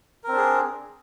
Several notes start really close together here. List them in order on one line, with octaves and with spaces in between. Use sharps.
A#4 C4 D4 G#4